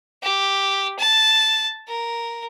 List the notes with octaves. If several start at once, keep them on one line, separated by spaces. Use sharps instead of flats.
G4
A5
A#4